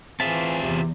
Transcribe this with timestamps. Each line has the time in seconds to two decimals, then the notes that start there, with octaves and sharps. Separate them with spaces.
0.20 E3 C4 F4 G#4 E5 A5
0.62 E2 C3